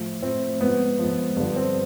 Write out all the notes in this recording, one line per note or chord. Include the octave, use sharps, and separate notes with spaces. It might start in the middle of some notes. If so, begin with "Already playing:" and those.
Already playing: A2 F3
A2 F3 C4
G#2 F3 B3
G#2 F3
G2 D3 F3 B3
C4